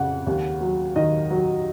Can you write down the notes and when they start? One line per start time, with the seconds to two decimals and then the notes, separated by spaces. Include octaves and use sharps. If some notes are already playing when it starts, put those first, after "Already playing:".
Already playing: F2 C#3 F#5
0.27 D#2
0.61 F#3
0.96 D#3 D#5
1.30 F#3